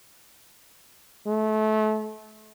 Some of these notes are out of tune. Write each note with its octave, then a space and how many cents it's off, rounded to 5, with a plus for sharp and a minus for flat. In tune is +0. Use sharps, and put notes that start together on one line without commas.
A3 -30